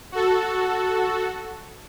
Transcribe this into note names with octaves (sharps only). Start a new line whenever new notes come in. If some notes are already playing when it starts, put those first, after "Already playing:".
F#4 A4